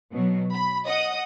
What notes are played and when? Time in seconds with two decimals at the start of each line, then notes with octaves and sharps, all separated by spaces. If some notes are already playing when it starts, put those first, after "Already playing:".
0.13 B2 F#3
0.53 B5
0.86 D#5 F#5 D#6